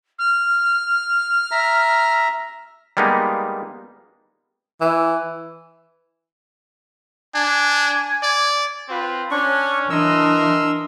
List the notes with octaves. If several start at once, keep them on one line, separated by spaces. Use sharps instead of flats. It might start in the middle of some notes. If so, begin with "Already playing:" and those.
F6
E5 A#5
G3 G#3 A#3 B3 D#4
E3
D4 G#5
D5
C4 F4 B4
C#4 D4 C#6
E3 D4 A#4 D#5 C6 E6